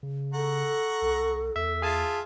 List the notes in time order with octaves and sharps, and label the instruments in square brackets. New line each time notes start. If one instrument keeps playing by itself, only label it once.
[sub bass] C#3
[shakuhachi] A4 [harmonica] F#5 A#5 C#6
[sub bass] C2
[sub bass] E2 [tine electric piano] E5
[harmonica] F4 E5 F5 [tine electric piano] G#4 G#5 A5